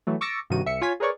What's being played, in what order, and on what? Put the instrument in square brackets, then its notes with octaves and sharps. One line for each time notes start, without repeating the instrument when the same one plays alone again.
[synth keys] E3 F#3 A3
C#6 D6 E6 A6 A#6 C#7
G2 C3 D#3 F#4 D#7
C2 E5 C#7
F4 C#5 G#5 G#6 B6
G#4 A#4 B4 C#5 D5 C#6